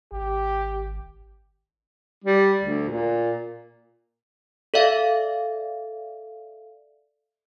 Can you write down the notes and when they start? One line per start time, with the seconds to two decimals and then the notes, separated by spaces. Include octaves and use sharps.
0.12 G#1 G4
2.24 G3
2.63 D2
2.89 A#2
4.74 A4 D5 E5 F5